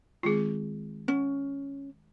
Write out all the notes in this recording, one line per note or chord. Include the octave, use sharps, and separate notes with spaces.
D#3 G#3 C4 F4 G#4
C#4 F#5